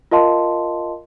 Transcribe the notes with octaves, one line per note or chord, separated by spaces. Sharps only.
F4 A#4 D#5 F5 A5 C6